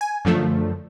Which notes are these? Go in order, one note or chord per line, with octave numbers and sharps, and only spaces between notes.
G#5
F#2 D3 F3 A3